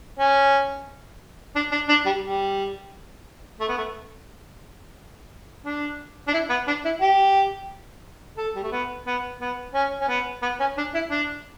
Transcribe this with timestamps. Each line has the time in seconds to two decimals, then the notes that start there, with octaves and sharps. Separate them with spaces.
0.19 C#4
1.55 D4
1.71 D4
1.89 D4
2.05 G3
2.23 G3
3.60 A3
3.68 B3
3.77 A3
5.65 D4
6.27 D4
6.33 E4
6.49 B3
6.67 D4
6.85 E4
7.01 G4
8.37 A4
8.56 G3
8.63 A3
8.72 B3
9.06 B3
9.41 B3
9.74 C#4
10.01 C#4
10.08 B3
10.42 B3
10.60 C#4
10.77 D4
10.94 E4
11.10 D4